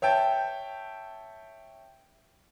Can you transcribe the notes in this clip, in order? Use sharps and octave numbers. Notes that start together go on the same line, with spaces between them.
C#5 E5 G5 A5